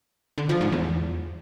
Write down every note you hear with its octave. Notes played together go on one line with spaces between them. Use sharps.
D3
F3
G#2
E2